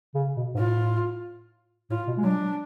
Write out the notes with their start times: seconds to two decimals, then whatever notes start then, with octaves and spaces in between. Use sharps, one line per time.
0.14 C#3
0.36 B2
0.54 G#2
0.58 A2 F4
1.90 A2 F4
2.07 B2
2.18 G#3
2.24 F#3 D4
2.41 F#3